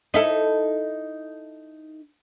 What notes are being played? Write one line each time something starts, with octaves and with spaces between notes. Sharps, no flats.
D#4 E4 A4